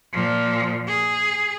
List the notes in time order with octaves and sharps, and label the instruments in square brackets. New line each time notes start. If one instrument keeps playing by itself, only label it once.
[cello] A#2 F3
G#4